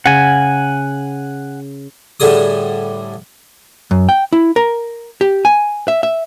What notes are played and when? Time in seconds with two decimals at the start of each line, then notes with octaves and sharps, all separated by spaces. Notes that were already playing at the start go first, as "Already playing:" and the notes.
0.06 C#3 F#5 G#5
2.20 A2 D3 G3 G#4 D#6
3.91 F#2
4.09 G5
4.33 E4
4.56 A#4
5.21 G4
5.45 G#5
5.88 E5
6.03 E5